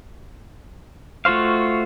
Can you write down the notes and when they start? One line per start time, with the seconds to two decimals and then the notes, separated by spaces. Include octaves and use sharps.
1.25 A3 F4 F#4 C5 F5